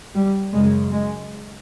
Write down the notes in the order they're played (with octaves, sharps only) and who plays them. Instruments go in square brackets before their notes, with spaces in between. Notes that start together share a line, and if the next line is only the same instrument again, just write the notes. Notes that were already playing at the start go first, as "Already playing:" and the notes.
[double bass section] G3
F#2 C#3 G#3
G#3